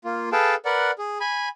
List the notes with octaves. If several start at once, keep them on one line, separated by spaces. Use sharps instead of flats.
A#3 F4
G#4 A4 B4 F5 G5 A5
A#4 B4 D5 F#5
G#4
G#5 B5